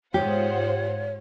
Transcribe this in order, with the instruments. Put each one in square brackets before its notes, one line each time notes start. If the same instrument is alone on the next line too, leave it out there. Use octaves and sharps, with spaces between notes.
[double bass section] G#2 [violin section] F4 C5 F#5 [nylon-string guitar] G4 [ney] C#5